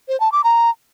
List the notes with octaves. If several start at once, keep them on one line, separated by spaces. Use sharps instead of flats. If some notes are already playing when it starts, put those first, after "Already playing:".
C5
A5
D6
A#5